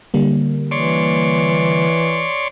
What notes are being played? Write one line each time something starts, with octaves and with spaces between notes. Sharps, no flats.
D3 G3 A#3
E3 C#5 D5 C6